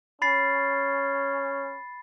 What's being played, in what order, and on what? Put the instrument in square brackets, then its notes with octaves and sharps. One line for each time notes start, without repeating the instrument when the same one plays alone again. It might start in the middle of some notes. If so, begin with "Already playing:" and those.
[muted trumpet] C#4 [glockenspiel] B5 A6 C7